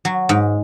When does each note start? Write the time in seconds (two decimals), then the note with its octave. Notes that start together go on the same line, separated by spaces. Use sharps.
0.05 F#3
0.29 G#2